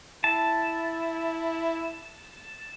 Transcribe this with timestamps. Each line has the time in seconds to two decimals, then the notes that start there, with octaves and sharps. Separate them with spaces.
0.24 E4 A5